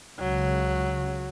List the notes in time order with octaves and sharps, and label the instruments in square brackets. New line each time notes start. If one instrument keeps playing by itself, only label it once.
[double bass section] C#2 C#3 [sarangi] F#3